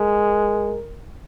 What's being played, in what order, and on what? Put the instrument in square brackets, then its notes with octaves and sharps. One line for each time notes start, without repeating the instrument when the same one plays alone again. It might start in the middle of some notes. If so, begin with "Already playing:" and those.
Already playing: [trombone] G#3 [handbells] A#4